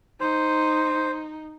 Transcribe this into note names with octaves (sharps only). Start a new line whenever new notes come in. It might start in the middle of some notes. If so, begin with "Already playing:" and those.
D#4 C5